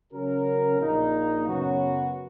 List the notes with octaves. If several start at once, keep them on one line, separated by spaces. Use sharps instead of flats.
C#3 F#3 C#4 F#4 A#4
A#1 A#2 A#3 D#4
F#2 C#3 F#3 B3 F#4